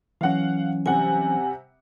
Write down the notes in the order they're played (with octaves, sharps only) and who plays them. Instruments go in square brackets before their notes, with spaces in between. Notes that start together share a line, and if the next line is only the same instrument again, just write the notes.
[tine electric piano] E3 F#3 C#4 [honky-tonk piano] F5 F#5
[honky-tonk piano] C3 G3 F#5 [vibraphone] G#5